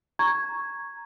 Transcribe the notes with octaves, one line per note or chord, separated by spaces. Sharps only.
A#5 C#6 G#6